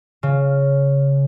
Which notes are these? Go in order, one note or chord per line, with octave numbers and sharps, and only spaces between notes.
C#3